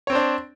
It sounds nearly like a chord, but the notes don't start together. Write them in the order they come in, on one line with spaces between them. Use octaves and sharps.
C#5 C4 C5 D4